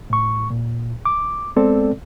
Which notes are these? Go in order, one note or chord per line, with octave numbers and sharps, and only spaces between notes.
A2 C#6
A#2
D6
G#3 B3 C4 A4 D5